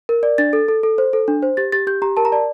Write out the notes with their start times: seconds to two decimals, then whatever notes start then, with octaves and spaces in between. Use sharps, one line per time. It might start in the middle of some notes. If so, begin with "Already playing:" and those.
0.09 A#4
0.23 D5
0.38 D4 A6
0.53 A4
0.68 A4
0.83 A4
0.98 C5
1.13 A4
1.28 D4
1.42 C5
1.57 G4 A6
1.72 G4 A6
1.87 G4 G6
2.02 G4 A#5
2.17 A#4 A5
2.25 A#5
2.32 D5 A5